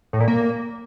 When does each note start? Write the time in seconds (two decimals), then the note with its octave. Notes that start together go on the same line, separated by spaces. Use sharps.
0.13 A2
0.20 A#2
0.28 A#3